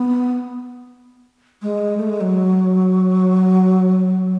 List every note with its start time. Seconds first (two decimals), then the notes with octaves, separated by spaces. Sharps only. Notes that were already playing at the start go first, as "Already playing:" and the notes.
Already playing: B3
1.62 G#3
1.97 A3
2.09 G#3
2.21 F#3